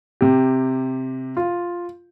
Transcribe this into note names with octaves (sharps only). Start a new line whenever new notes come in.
C3 G4
F4